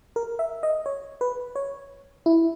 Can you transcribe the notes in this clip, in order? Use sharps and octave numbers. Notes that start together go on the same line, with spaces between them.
A#4
E5
D#5
C#5
B4
C#5
E4